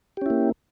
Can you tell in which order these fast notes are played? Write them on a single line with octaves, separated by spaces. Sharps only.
G4 C#4 E4 A#3